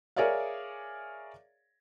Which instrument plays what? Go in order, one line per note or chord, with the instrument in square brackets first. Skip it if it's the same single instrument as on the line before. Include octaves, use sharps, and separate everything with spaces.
[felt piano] G#4 A#4 C#5 D5 E5 F5